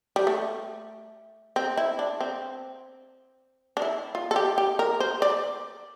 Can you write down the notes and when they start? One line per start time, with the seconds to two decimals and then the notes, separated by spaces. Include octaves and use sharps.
0.16 G3
0.27 A3
1.56 C4
1.77 E4
1.99 D4
2.21 C4
3.77 D4
3.82 E4
4.15 F4
4.31 A4
4.36 G4
4.58 G4
4.79 A#4
5.00 C5
5.22 D5